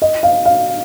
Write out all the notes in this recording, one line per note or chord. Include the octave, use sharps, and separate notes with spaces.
D#5
F5
F5